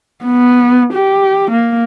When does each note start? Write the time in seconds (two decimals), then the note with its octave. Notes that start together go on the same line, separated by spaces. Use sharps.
0.25 B3
0.93 G4
1.51 A#3